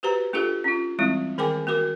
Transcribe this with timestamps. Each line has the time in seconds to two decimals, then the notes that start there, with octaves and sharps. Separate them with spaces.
0.03 F#4 G4 B4 C5 A#5
0.33 A#3 D4 F4 G4 A4
0.64 C#4 F4
0.99 E3 G3 G#3 C4 E4
1.38 D#3 G#4 A#4 G5 G#5 D6
1.67 A#3 F#4 A#4 D6